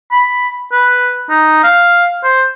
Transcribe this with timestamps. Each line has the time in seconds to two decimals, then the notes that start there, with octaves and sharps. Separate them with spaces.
0.12 B5
0.72 B4
1.30 D#4
1.64 F5
2.24 C5